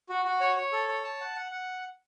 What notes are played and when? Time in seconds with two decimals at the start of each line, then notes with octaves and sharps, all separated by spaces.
0.09 F#4
0.25 F#4
0.41 C#5
0.56 C#5
0.72 A4
0.88 C#5
1.04 A5
1.21 F#5
1.36 F#5
1.51 F#5